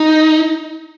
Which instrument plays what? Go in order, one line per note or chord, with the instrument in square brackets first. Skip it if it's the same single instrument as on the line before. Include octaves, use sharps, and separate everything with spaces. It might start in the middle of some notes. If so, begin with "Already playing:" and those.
Already playing: [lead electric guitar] D#4